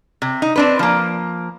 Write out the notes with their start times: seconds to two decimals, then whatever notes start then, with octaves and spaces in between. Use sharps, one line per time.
0.22 C3
0.42 D#4
0.56 C4 D4 B4
0.79 F3 A#3